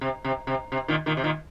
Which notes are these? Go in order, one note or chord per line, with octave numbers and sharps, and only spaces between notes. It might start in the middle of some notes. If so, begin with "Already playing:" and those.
C3
C3
C3
C3
A#2 D#3
A#2 D#3
C3
A#2 D#3